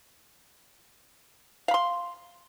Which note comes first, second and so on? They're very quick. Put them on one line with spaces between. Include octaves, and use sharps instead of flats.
F5 B5 C6